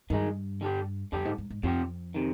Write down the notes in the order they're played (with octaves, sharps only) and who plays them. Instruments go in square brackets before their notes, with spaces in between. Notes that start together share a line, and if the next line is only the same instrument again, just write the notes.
[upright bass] G2 [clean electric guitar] D#3 G#3 D#4
[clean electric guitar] D3 G3 D4 G4
[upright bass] F2 [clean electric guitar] D3 G3 D4 G4
[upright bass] G#2
G#2
G#2
[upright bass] F2 [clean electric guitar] C3 F3 C4 G4
[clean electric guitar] C3 D#3